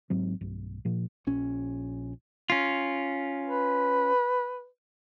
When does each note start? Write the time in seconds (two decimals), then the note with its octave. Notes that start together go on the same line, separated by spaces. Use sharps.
0.10 G#1 G#2 F#3 C4
0.41 B1 G2
0.85 A#2 F3 A#3
1.27 A#1 C#4
2.50 C#4 F4
3.46 B4